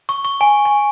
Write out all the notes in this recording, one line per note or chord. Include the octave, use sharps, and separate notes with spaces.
C#6
C#6
G#5
G#5